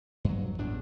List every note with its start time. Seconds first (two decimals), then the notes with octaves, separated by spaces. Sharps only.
0.25 G2 F#3
0.58 A1 E2 G2 D4